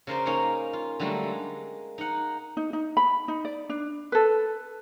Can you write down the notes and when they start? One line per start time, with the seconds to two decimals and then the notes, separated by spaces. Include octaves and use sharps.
0.07 C#3 A#4 C5 D5
0.26 A#3 C#4 D#4 C#5 F5 A#5
0.73 F4
1.00 D3 F#3 G3 A3 A#3
1.23 G#3
1.98 D#4 F#5
2.57 D#4
2.73 D#4
2.97 B5
3.28 D#4
3.45 D5
3.69 D4
4.12 A4 B4